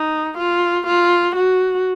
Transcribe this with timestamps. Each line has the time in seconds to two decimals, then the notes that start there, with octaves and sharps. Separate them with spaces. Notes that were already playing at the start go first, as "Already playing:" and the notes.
Already playing: D#4
0.38 F4
0.87 F4
1.36 F#4